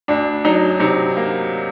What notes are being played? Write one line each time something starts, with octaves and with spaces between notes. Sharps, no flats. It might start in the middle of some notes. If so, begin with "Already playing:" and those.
D2 D4
F#3 D#4
C3 D#4
A#3